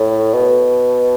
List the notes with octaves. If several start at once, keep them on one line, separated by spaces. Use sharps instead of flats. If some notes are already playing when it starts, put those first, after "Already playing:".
Already playing: A2
B2